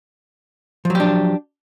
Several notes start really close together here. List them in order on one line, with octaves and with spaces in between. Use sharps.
F3 F#3 G4 D4